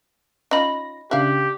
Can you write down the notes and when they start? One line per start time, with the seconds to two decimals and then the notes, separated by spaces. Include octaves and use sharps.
0.51 C#4 D#4 F4 D#5 B5 A#6
1.11 C#3 D4 G4 E5 F5 F#6